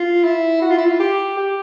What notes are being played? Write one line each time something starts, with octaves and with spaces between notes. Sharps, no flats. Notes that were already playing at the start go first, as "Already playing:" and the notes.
Already playing: F4
E4
F#4
F4
E4
F4
G4
G4